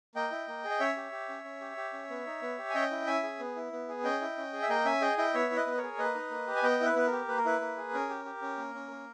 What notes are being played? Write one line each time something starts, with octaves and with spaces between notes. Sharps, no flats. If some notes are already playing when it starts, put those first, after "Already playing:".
A#3 D#5 G5
E4
A#3
G#4
D#5
C#4 C#5 E5
G4
G4
C#4
C#4
G4
G4
C#4
B3
D#4
B3
G4
G#5
C#4 D#5 G5
E4
C#4 E5 G#5
G#4
B3
E4
B3
G#4
C#4 D#5 G5
E4
C#4
G#4
E5
A#3 D#5 G5
C#4 E5 G#5
G#4 D#5 G5
E4 D#5 G5
B3 C#5 E5
E4
B4 D#5
B3
A#4 C#5
G#4
A#3 B4 D#5
D#4
A#3
G4
G#5
B3 D#5 G5
E4 B4
B3 B4
A#4
G4
A#3 B4
A#4
E4 B4
A#3
G#4
C#4 A#4
G4
G4
C#4
A#3
C#4
A#3